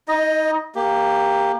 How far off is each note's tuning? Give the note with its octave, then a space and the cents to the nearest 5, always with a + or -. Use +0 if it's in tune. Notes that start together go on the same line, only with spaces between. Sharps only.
D#4 +30 D#5 +0
A#3 +0 G4 +15